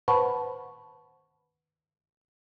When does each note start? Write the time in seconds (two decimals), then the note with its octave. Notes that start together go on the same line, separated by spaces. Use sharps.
0.08 B4 C5 F#5 A5 B5 C#6